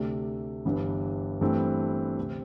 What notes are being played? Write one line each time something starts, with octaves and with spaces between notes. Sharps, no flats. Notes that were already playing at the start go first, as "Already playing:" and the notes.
Already playing: D2 C3 A3 D4
G1 G2 E3 G3 E4
G2 E3 A3 C4
D2 C3 A3 C4